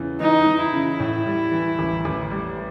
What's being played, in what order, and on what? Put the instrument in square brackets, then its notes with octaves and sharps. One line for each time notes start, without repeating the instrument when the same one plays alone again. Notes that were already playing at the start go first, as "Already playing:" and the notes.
Already playing: [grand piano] E2 C#3 E3
[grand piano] E3 [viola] D#4
[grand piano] E3
[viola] E4
[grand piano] C#3
[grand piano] A2 [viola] E4
[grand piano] G3
E3
A1
A1
G3